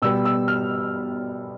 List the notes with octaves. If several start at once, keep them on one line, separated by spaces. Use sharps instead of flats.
B2 G3 B3 E6
E6
F6